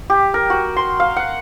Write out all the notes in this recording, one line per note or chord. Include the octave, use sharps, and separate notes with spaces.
G4
A#4
F#4
C6
F5
F#5